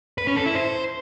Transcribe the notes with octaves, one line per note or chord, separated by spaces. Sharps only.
B4
C#4
A4
E4
C5